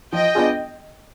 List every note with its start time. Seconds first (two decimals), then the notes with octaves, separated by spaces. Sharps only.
0.13 F3 D#5 G5
0.35 B3 D4 F4 G#4